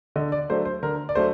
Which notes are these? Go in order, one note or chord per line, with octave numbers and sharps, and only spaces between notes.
D3 D#5
D5
F#3 A3 D4 C5
C5
D3 A#4
D5
F#3 A3 D4 C5